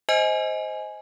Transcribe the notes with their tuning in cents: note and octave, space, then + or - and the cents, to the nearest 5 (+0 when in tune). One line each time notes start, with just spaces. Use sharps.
C5 +0 D#5 +15 G#5 +10